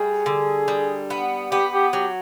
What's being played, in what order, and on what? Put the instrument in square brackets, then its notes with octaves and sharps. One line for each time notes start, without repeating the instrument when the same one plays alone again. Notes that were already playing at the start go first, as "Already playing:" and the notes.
Already playing: [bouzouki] A2 G3 [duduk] G#4
[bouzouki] D3
G3
B3
[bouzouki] B3 [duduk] G4
[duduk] G4
[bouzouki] F#3 [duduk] G4